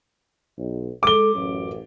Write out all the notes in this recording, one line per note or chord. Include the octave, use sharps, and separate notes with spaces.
B1
G#3 A4 D6 G7
A1 F#2